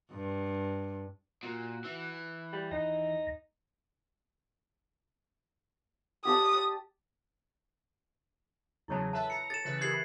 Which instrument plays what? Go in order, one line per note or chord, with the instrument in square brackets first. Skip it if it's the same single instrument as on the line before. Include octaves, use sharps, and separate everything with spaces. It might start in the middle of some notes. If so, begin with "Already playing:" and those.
[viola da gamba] G2
[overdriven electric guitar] A#2 [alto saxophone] F#4
[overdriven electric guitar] E3
[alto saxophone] G3
[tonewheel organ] D#2 A#6 [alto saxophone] D#4
[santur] G4 D5 A5 [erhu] D#6
[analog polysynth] E2 C#3 F#3 [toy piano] E4 C#5 A5
[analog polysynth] A4 B4 E5 [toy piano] A5
[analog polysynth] A#5 [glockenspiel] C#7
[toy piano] A4 [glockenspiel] A6 E7
[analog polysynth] C#3 E3 B4
[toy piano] G4 A#4 [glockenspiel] G#6 C7 F#7